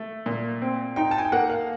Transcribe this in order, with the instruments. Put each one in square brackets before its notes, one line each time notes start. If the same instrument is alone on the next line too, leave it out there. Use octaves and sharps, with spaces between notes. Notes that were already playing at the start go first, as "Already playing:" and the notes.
Already playing: [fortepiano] A3
A#2
C4
[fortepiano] D#4 [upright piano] G5
[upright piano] A5
G#5
G5
[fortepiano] A#3 [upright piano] F#5
[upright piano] F5